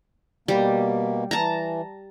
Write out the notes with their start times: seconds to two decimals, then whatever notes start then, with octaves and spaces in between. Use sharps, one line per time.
0.48 B2 G3 A#3
1.31 E3 A5 A#5